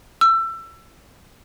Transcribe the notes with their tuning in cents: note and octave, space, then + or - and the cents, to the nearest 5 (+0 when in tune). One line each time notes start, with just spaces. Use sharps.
E6 +25